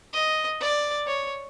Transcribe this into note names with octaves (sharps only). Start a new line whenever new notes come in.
D#5
D5
C#5